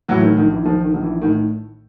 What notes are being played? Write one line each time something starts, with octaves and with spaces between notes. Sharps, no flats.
A2 E3 F#3
D#3
A#1 D#3
E3
A#1 D#3 F3
D#3
A#1
E3
A2 D#3